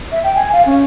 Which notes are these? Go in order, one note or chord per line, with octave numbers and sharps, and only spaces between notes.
E5
G5
G#5
F5
C#4